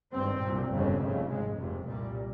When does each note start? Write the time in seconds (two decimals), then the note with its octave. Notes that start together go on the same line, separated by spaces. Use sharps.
0.13 G#1 G2 C4
0.42 C2 A#2
0.71 G1 F2 C#3
1.00 F1 F2 C#3 A#3
1.29 G#1 G#2 G#3
1.58 F1 F2 C3
1.87 C2 A#2 G3